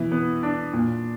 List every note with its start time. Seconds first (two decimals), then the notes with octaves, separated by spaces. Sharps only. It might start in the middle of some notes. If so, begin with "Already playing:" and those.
Already playing: B2 E3
0.11 B3
0.43 D4
0.73 A#2